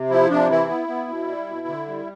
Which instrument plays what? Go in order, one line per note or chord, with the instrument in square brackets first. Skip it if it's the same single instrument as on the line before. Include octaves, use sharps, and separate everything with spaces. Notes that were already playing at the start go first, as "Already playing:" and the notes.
Already playing: [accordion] C3
F3 E4
C3 D4
E3 E4
B3
B3
B2
G3
B2
D3
G3